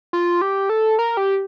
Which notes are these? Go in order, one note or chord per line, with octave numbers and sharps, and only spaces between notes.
F4
G4
A4
A#4
G4